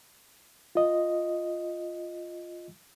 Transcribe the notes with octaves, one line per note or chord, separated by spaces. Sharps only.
F4 D#5